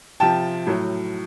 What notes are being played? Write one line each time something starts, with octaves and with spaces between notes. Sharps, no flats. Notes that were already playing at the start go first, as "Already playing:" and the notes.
C3 F3 G5 A5
A2 F#3